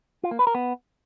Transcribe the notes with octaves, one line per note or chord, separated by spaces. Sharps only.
F4
A#3
B4
A#4
B3